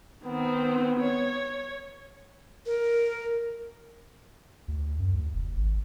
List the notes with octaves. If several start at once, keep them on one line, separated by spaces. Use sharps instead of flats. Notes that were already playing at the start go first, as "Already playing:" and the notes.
D#3 B3 C4
C#5
A#4
D2
F#2
D2
F1
G#1